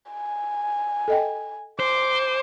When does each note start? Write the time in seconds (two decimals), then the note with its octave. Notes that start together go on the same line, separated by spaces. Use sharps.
0.12 G#5
1.08 A4 D#5 G5
1.80 C5 D6